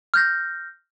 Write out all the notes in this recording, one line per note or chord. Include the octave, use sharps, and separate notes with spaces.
F6 G6 A#6